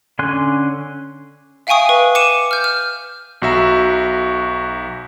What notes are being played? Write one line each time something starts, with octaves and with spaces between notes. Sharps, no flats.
D3 C#4 G#5 C6 F#6
E5 F5 G5 G#5 C#6 D#6
B4
D6 C#7 D#7 E7
F6 G6
F6
B1 F#4 E5 A#5